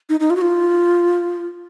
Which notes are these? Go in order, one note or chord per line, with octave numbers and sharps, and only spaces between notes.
D#4
D#4
F4
F#4
F4